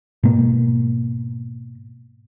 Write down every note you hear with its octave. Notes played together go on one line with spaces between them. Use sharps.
G#2 B2 A#3